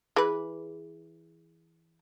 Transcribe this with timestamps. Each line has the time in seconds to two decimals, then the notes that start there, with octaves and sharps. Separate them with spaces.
0.16 E3 G#4 B4